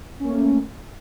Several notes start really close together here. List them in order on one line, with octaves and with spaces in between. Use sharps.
C#4 A#3 A3